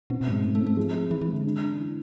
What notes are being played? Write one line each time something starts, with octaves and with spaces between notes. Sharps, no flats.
B2 C4
B2
G#2
G#3
G#2 A3
A3
C4
A3
F3 G#4
G#4
E3 G#4
E3
G#3
D3
D4
D4
E3